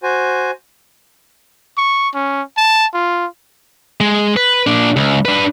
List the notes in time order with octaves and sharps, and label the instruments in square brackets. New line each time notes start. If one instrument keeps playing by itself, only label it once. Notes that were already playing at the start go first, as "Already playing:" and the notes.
[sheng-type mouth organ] F#4 C5 G#5
[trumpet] C#6
C#4
A5
F4
[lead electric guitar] G#3
B4
A#2 D4
C#2
D4 B4